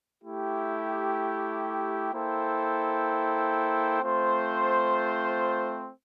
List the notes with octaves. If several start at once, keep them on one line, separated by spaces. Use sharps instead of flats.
A3 E4 G4
A#3 E4 A4 C5 G5
A3 C4 F4 C5